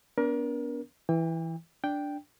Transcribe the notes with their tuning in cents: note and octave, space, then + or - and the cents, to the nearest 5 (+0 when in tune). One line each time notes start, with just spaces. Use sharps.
B3 +0 D4 -30 A#4 +30
E3 +0 G5 +40
D4 -5 G5 +0